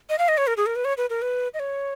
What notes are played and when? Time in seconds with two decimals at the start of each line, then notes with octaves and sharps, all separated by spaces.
0.09 D#5
0.19 F5
0.28 D#5
0.38 C#5
0.47 A#4
0.57 G#4
0.66 A#4
0.76 B4
0.85 C#5
0.97 B4
1.10 A#4
1.22 B4
1.54 D#5
1.59 C#5